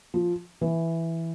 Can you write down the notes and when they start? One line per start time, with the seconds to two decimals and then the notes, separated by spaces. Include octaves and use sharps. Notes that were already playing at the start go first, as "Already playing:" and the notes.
0.14 F3
0.61 E3